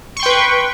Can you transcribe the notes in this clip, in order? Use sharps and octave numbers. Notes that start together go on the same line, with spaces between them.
B4 G5 C6 C#6